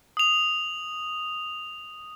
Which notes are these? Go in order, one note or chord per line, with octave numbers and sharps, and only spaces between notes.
D#6 F7